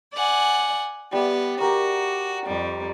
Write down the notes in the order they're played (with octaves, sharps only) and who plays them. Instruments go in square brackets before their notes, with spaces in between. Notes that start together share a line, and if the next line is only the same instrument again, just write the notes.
[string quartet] D5 F#5 G#5
[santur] G3 E5 D6 [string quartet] B3
[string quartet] F#4 [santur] G4 A#4
[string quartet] F2 G3